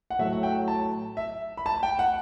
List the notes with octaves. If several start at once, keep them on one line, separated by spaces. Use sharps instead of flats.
F#5
A2 F#3 A3 E5
F#5
G5
A5
E5
B5
A5
G5
F#5